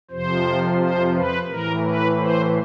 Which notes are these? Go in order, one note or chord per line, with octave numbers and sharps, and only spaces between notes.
F2 C3 F3 C5
C5
B4
A2 E3 A#4
B4
C5